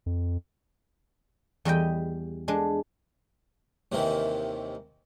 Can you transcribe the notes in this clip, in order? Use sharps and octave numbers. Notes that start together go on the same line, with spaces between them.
F2
E2 G3 D#5 G5
G#3 D4
D#2 C3 D#3 E3